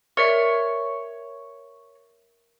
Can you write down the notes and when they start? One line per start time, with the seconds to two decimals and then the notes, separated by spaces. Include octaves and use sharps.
0.17 A#4 C#5 D5 E5